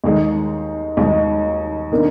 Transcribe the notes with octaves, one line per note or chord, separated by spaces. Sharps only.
D#2 D#3 G#3 D#4
D#2 D#3 G#3 D#4
D#3 A#3 D4